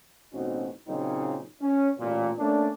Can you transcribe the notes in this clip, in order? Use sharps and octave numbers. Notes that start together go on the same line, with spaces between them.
A1 B2 C4 C#4 D#4 F#4
A#2 C#3 F#3 C4 D#4
C#4
A1 A#2
A3 A#3 C#4 D4